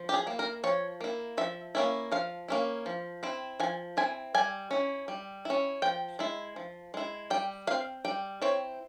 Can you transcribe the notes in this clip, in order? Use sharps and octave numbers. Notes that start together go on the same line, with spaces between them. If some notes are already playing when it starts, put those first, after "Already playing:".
Already playing: F3
G4
G#4
A#3 E4
A#4
F3 C#5
A#3 E4
F3 E5
A#3 C#4 E4
F3 F5
A#3 C#4 E4
F3
C4 E4
F3 G#5
C4 E4 G#5
G3 G#5
C#4 E4
G3
C#4 E4
F3 G5
G#3 E4
F3
G#3 E4
G3 G5
C4 E4 F5
G3 G5
C4 E4 C#5